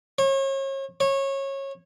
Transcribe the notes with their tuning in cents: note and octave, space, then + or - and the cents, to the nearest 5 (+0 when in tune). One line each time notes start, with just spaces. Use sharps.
C#5 -35
C#5 -20